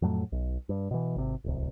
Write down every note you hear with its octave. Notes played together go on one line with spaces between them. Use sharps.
F2 A2 F#3 A3
B1
G2
B2 E3
G#1 C3
D1 C2